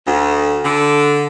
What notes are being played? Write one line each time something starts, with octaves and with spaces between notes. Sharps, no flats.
D2
D3